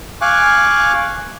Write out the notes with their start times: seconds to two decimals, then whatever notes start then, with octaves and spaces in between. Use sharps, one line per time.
0.21 F5 G#5 C#6 D6 F#6